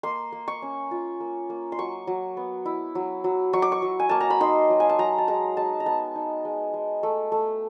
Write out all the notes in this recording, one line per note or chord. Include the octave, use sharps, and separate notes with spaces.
A#3 C6
A#3
C#6
C#4
F4
A#3
A#3
C6
F#3 C#6
F#3
B3
E4
F#3
F#3
F#3 C#6
D6
C#6
F#3
G#5
A#3 A5
A#5
B5
D#4 C6
F#3
G#5
A5
F#3 A#5
A5
G#3 A#5
G#3 A5
A#5
B3 A5
D#4
G#3
G#3
A3
A3